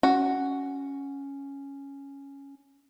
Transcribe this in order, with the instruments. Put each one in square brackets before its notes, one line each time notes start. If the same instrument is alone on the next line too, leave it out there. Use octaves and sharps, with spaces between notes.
[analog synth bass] C#4 [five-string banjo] F#4